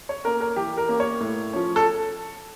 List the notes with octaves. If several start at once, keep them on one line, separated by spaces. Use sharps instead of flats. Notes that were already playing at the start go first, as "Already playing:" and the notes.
C#5
A#3 C#4 A#4
A#4
E3 G4
A#4
A#3 C#4
C#5
A2
F3 C#4
A4